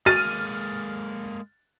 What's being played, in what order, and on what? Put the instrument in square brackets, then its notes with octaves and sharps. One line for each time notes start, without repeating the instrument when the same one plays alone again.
[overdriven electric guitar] G#3 A#3 [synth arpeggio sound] F#4 [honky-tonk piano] F6 D#7 [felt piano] A6